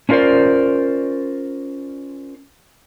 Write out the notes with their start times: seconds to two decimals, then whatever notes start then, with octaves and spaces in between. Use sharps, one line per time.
0.09 C#4 D4 F4 A#4 C5 D5